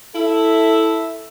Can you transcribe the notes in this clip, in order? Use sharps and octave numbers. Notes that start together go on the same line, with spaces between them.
E4 A4 E5